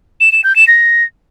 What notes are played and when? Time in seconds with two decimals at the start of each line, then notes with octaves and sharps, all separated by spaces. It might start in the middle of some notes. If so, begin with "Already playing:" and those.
0.20 E7
0.32 E7
0.44 G6
0.56 E7
0.67 A#6